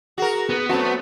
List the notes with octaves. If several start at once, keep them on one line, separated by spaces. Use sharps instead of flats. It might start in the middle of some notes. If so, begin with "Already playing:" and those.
F#4 G#4 A#4
B3
F#2 A3 C4 F#4 A5